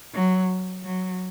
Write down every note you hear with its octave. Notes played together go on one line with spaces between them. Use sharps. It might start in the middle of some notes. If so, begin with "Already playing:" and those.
F#3
F#3